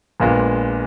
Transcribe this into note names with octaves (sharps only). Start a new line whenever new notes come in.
A#1 A#2 G#3 B3